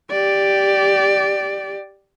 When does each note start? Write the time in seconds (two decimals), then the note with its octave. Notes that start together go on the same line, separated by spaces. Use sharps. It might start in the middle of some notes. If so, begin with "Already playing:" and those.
0.11 G4 D5